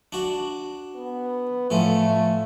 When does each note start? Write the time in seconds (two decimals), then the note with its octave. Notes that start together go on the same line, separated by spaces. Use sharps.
0.12 D4 F#4
0.96 B3
1.70 A2 F3 A3 C#4